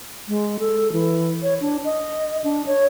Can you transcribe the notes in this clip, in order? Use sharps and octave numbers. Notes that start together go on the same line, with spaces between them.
G#3
A4
E3
C#5
D4
D#5
D4
C#5